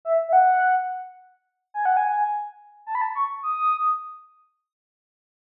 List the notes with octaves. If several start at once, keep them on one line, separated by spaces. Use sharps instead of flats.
E5
E5
F#5
G#5
F#5
G#5
A5
B5
A5
C#6
D#6